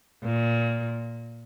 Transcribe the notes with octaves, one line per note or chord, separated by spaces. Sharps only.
A#2